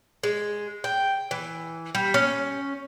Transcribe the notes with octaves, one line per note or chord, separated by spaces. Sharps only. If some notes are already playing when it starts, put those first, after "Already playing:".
G#3
G5
E3
G3
C#4